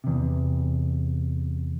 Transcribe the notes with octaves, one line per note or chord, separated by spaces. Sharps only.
E2 C3